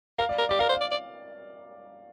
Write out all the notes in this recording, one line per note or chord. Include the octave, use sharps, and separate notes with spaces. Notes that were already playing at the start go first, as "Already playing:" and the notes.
A#4 F5
D5
A#4
G4 D5
A#4 F5
C5
F5
D5
D5